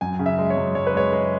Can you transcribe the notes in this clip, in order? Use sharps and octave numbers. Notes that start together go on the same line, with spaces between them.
F#2 G#5
C#3
E5
G#3
C#5
F#2
F#2 C#5
B4
G#3 C#5
G#3